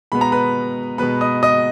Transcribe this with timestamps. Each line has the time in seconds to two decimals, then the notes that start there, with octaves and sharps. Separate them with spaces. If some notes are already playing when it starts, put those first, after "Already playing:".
0.12 B2 G#3 B3 B5
0.21 A#5
0.32 B4 B5
0.98 B2 G#3 B3 B4 B5
1.21 D#5 D#6
1.43 D#5 D#6